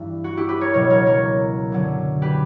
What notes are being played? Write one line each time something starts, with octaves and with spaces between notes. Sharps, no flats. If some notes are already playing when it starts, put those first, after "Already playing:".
Already playing: G2 E3 E4
F#4
E4 G4
G4 B4
A#4 C#5
C#2 B2 F#3 A#4 C#5
A#4 C#5
A#4 C#5
F#2 D3 F#3
G4 B4